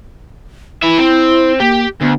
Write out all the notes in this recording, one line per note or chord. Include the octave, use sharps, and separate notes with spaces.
E4 B4 E5
C4
A#3 G4
D2 B3